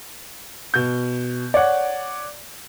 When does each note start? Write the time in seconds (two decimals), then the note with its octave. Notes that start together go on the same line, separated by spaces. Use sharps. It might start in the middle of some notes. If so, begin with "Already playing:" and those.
0.74 B2 G6
1.54 C#5 D5 F#5